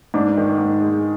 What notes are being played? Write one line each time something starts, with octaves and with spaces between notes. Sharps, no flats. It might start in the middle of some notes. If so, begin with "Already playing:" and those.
G#2 D4
D#3
G#2
G#3